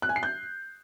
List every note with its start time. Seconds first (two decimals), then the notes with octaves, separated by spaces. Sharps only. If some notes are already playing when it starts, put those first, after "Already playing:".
0.02 F#6
0.09 G#5
0.16 C7
0.23 G6